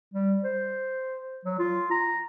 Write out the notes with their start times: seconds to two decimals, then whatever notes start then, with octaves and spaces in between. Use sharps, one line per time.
0.14 G3
0.44 C5
1.45 F#3
1.59 F4
1.91 A#5